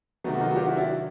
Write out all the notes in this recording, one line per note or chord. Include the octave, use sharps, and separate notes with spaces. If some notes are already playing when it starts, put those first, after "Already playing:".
C3 D#3 F#3 A3 B3
F#4
D#4 F4
F#4
F4 G4
E4 F#4
D4 E4